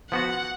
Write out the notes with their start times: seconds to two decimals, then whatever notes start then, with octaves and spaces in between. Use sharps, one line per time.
0.11 F3 B3 F#4 F#5